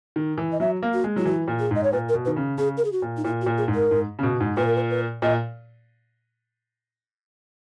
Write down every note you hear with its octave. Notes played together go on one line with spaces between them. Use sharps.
D#3
E3
D#5
F#3 E5
A#3
F#4
G#3
F#3 E4
E3 F#4
A#2
G#4
G#2 D#5
C#5
A#2 B4
A#4
B2
D#3 B4
C#3
C#3 G#4
A#4
G#4
F#4
A#2
D#4
A#2 E4
F#4
A#2
G#4
G#2
A#4
G#2
C#3
B2
G#2
A#2 B4
A#4
B4
B4
A#2 D#5